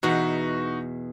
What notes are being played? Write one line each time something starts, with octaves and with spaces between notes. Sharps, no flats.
E2 B2 D#4 F#4 F#5